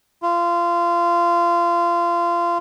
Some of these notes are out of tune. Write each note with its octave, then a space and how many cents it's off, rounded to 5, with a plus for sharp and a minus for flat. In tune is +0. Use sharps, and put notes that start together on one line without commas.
F4 -25